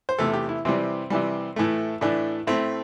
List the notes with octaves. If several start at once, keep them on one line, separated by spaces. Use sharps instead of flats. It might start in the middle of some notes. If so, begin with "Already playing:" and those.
C5
E2 C3 A3 A4
G4
E4
C3 E3 G3 C4
C3 E3 G3
A2 E3 A3
A2 E3 A3 D4
A2 A3 C4